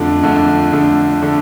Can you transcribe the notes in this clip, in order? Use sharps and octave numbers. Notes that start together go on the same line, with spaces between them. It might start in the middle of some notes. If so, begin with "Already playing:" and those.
Already playing: F2 D3 A3 D4
F2 D3 A3 D4
F2 D3 A3 D4
D3 A3 D4